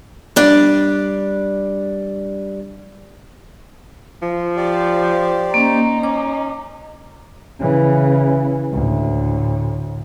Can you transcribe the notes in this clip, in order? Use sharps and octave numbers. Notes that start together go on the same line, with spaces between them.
G3 D4 D5
F3
G4 C5 D5
A#3 C#4 D#4
C#4 D6
C#3 E3
D2 A2